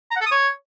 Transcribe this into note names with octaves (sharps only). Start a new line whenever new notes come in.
A#5
F#5
A4
D#6
C#5